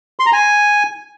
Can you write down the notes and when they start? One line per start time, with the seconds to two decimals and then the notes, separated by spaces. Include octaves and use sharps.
0.20 C6
0.26 A#5
0.33 G#5